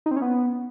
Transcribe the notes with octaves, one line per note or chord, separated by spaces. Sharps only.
D#4
C4
C#4
B3